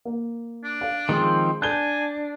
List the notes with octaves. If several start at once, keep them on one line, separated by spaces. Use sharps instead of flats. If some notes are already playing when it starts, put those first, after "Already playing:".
A#3
D4
F5
D#3 F3 G#3 C4
D4 G#5 G6 G7